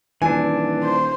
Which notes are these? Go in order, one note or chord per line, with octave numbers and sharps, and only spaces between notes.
D#1 E3 D4 G#5
C5